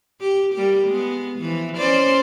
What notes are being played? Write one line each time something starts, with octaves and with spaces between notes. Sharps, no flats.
G4
G3 A#3 G4
G#3 B3
E3 F3
C#4 C5 D5